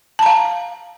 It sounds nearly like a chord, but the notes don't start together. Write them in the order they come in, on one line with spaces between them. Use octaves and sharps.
A5 A#5 F5